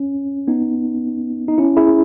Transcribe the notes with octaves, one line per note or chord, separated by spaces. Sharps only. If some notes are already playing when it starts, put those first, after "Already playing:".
Already playing: C#4
B3 D#4
D#4
C#4 E4
E4 G#4